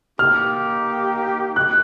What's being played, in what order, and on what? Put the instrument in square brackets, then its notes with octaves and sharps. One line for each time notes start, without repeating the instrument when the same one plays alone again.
[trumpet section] A#3 D#4 G4 [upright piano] F6
[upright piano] F#6